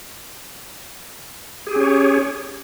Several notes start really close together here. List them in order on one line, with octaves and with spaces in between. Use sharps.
G#4 G4 C#4 C#5